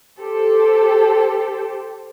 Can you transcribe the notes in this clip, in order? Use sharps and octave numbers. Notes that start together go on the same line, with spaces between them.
G4 A4 C5